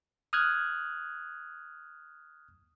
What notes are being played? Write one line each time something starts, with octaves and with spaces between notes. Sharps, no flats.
D#6 F6 F#6 G#6